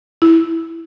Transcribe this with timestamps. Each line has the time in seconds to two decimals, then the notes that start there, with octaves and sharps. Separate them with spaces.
0.22 E4